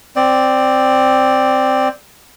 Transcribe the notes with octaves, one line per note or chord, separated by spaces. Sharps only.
C4 D5